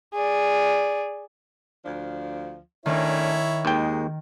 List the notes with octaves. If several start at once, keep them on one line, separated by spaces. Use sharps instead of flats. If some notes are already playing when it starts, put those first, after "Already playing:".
G#4 D5
D2 F3 D4
D#3 A3 C#4 D4 E4 C#5
D#2 G#3 G5